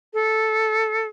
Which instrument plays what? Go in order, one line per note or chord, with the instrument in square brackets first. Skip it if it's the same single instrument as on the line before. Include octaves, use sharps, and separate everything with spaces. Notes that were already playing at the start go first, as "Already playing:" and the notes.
[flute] A4